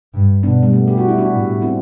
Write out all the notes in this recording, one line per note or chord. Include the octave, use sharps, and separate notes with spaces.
G2
B2 B3 D4
G3 B3
A3
G4
F#4
E4
D4 F#4
A2
C4 E4